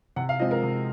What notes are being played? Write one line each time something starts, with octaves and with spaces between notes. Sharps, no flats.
C3 F#5
F5
F3 G#3 C4 D#5
A#4
C3